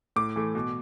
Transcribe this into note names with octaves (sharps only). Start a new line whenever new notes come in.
A2 D6
E3 A3
B2